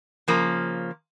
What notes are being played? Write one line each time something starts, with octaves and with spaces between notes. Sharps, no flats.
C#3 F3 A#3